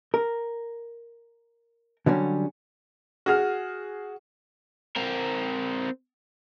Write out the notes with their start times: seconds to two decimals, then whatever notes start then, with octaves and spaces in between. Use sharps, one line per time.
0.14 A#4
2.06 D3 F#3 G3 C#4
3.26 F#4 G#4 F6
4.96 C4 A#4